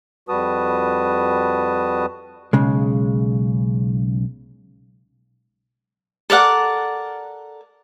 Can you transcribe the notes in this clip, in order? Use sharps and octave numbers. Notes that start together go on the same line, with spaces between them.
F2 G3 F#4 B4 A5 D#6
B1 C#3 G#3
A4 A#4 D5 F#5